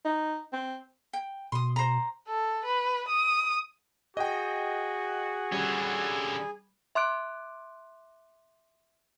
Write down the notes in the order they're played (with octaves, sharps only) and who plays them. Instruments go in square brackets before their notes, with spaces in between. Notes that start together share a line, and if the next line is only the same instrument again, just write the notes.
[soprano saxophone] D#4
C4
[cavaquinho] G5
[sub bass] B2 [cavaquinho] C6 D#6
[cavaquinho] C5 A#5
[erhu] A4
B4
D#6
[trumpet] F#4 [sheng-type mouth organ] G#4 [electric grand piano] D#5 G5
[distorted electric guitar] D3 C#4 [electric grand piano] G3
[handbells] E5 C6 D6 F#6 D7